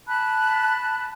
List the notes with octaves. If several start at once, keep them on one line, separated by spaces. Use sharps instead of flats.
A5 B5 F#6